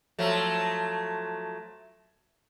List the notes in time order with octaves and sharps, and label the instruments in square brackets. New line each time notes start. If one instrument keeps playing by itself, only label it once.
[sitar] F3 F#3 A3